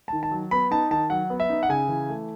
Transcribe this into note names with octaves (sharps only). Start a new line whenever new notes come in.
D#3 A5
A5
F#3
B3 B5
D#4 A5
D#3 A5
F#3 F#5
B3
E5
D#4
F#5
C#3 G#5
E3
A3